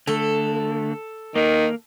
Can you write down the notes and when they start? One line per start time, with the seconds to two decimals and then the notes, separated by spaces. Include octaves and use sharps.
0.07 D3 A3 A4
1.35 D#3 A#3